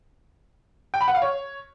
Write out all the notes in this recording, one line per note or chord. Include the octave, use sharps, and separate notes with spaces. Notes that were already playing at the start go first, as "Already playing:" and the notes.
G5
B5
F#5
F5
C#5